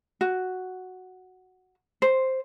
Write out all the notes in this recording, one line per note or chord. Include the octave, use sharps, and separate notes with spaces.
F#4
C5